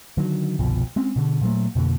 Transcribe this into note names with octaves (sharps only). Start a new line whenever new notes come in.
D3 D#3 F#3
G1 C2 B2 F3
G#3 C4 C#4
B2 D3
A#2 F#3 A3
F2 B2 D3 A#3